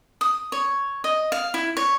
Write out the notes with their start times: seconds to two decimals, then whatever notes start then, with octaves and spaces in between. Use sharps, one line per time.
0.21 D#6
0.52 C#5
1.04 D#5
1.32 F5
1.54 E4
1.77 C#5